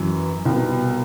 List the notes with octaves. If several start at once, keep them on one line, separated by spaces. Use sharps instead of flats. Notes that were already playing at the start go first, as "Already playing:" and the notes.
Already playing: F#2 E3
C2 B2